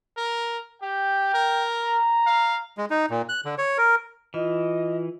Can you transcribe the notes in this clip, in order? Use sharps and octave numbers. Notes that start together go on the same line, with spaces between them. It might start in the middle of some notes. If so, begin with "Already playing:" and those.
A#4
G4 G5
A#4
A#5
F5
G#3
D#4
A#2
F#6
D3
C#5
A#4
E3 F4 D#5